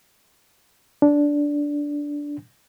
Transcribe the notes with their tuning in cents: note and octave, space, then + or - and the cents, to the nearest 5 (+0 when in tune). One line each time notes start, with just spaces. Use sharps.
D4 -10